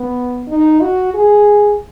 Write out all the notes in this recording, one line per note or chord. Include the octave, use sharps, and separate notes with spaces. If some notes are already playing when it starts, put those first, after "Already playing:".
Already playing: B3
D#4
F#4
G#4